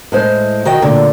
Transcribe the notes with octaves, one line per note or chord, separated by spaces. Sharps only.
A2 G#3 C5
D#3 F#4 D#5 G5
A#2 D3 A3